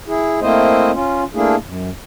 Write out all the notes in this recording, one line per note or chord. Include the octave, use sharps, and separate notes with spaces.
E4 G#4
A3 A#3 C4 E4 C5 D#5
C#4 F4
A3 A#3 D4 E4 G#4
F#2